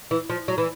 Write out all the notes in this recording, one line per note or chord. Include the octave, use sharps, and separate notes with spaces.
E3
F3
F#3
E3